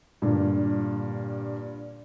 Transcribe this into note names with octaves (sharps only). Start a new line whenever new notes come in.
G2 A#2 D3